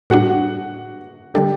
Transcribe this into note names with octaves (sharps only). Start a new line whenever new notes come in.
A2 G3 D4 F#4 F#5
D3 G3 D4 G4 A4 G5